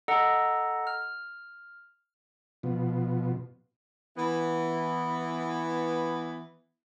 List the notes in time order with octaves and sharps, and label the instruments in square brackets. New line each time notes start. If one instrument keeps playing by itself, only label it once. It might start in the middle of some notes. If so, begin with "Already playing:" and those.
[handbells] A4 D#5 F#5 A#5
F6
[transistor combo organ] B2 F3
[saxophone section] E3 B3